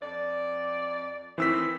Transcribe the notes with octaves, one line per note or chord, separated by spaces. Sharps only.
F2 D5
D#3 E3 A3 C4 E6 B6